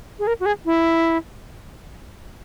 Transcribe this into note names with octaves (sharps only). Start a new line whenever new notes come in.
G#4
A#4
F#4
G#4
E4